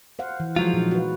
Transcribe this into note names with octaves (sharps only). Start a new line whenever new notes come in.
C5 F5 F#5
E3
F3 F#3 G#3 F4
A#2 D#4
F#4 B4